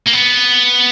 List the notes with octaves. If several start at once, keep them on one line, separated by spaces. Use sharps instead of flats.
A#3
B3